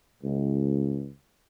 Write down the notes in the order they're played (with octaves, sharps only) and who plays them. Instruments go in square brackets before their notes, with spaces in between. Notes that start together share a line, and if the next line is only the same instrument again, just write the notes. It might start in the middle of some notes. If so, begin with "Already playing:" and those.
[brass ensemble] C#2